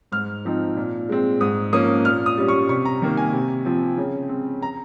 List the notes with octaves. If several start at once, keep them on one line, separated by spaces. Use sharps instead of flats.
G#2 F6
F3 C4 D#4
A#2
G#3 C4
G#2 D#6
F3 A#3 C#4 D#6
A#2 F6
D#6
G3 C#4
C#6
C3 C#6
A#5
D#3 A#3
G#5
C3
F3 C4
C#3
G#3 C4
A#5